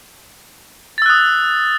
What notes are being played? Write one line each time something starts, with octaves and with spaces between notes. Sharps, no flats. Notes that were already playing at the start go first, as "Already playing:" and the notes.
D#6 E6 F#6 A6